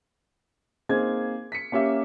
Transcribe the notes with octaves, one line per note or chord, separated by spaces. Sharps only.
A#3 C4 D#4 G#4 G#6
B6 C#7
A#3 C#4 G4 E5